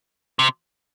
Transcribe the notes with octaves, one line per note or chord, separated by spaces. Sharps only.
C3